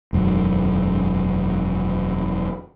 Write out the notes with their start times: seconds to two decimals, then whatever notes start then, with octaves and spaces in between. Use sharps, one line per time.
0.13 E1 F#2 D#3